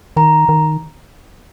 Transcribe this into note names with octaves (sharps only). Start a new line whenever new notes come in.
D#3 A#5
D#3